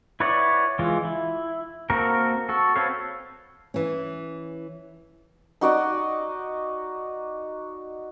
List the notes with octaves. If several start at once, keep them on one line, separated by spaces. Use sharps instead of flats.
E4 B4 C#5 D5 F#5
E3 G#3 F4
E4
A#3 C4 F#4 A4 A#4
F#4 A4
C4 A4 B4 C#5 F5
E3 C#4
D#4 F#4 D5 D#5